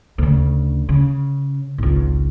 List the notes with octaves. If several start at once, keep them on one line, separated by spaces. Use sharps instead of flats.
D2 C#3
C#3
G#1 C#2